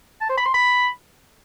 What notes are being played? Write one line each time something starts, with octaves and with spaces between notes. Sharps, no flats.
A5
C5
B5
C6
B5